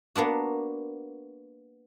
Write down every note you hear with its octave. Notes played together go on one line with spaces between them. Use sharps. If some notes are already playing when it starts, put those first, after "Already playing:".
A#3 B3 D4 F#4